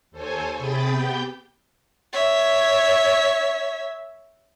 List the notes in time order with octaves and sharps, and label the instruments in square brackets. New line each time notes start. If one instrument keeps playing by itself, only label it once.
[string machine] D#2 A4 C5 C#5 G#5
C3 G#4 G5 B5 G6 A6
B3 G4 G5 G6
[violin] C#5 E5